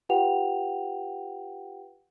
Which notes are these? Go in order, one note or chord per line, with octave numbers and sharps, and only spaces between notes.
F4 G4 B4 F#5 G5 F7